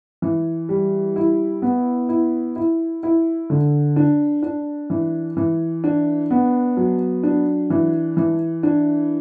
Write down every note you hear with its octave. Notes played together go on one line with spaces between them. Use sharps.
E3
G3
E4
B3
E4
E4
E4
D3
D4
D4
E3
E3
D4
B3
F#3
D4
E3
E3
D4